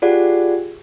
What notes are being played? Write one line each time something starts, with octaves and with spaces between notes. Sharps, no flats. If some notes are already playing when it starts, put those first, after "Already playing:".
F4 G4 G#4 D5 F#5